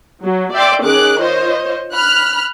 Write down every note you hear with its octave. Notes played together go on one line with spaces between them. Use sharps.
F#3
D5 E5 G5 C6 D6
D#3 C#4 G#4 D6 F#6
F4 C5 C#5 D#5
B5 F6 F#6